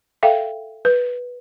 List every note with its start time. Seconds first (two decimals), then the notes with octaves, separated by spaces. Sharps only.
0.23 A4 E5 F5 G5
0.85 B4